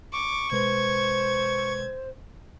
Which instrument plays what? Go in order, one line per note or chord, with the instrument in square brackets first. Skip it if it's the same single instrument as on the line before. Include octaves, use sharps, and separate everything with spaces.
[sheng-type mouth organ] C#6 [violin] D6
[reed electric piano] B2 G#3 B4 [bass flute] C5 [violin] G#6